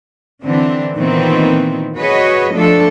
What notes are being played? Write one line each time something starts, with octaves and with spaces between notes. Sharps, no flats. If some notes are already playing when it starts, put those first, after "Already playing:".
D3 E3 C4 D4
A#2 D#3 E3 B3 C4
F#4 G#4 B4 C#5 D#5
F3 A3 D4 A4